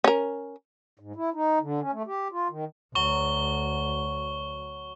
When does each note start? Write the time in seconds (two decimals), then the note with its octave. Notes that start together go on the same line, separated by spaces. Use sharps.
0.04 C#4 A#4
0.99 G#2
1.16 E4
1.34 D#4
1.61 D3
1.81 C#4
1.92 A3
2.07 G4
2.32 F4
2.50 D#3
2.95 D2 F#3 C#6 G7